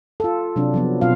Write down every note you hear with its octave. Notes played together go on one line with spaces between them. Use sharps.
F4 A4
C3 F#3 D4
F3 F#3 B3
B2 F#3 C4 F4 F5